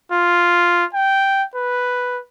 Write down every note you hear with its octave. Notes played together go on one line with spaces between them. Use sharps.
F4
G5
B4